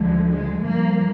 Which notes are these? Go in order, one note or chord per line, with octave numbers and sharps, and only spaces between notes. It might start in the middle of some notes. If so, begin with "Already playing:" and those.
Already playing: D2 D3 F3 G#3
G#3
G2 F3 A#3